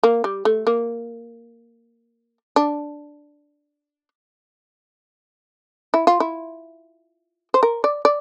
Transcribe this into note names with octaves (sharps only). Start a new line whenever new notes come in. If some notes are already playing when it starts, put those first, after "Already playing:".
A#3
G3
A3
A#3
D4
E4
F4
E4
C5
A#4
D5
D5